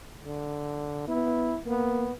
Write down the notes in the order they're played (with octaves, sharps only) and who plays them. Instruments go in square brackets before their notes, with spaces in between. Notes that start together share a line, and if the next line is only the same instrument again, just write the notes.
[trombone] D3
[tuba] B3 [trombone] E4
[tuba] A#3 [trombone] B3